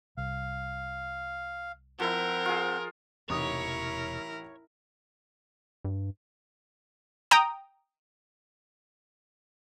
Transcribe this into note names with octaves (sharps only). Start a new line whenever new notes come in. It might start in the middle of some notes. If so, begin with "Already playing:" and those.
C2 F5
F3 C4 E4 A#4 F#5
F4 G#4
E1 A1 C3 D#4 E4 A#4 C#5 D#6
G2
G5 A#5 D#6